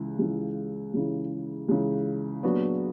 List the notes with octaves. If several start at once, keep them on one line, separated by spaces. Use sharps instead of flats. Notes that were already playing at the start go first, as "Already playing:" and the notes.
Already playing: C#2 C#3 E3
C#2 C#3 E3
C#2 C#3 E3
C#2 C#3 E3
A#2 F#3 B3 D4 F#4